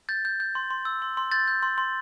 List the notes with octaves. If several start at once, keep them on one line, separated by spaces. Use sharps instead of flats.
G6 A6
G6
G6
C6
C6
E6
C6
C6
G6 A6
G6
C6
C6